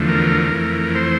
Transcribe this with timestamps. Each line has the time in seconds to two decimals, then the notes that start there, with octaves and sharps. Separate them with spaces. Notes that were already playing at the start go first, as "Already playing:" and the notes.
Already playing: E2 D3 F3 A3
0.09 A#4
0.52 F2 E3 A3
0.95 C5